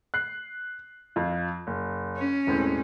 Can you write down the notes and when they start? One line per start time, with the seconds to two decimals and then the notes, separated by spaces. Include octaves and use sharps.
0.14 F#6 C7
1.16 F2 F4
1.67 F#1
2.17 C#4
2.47 E1 A2 C4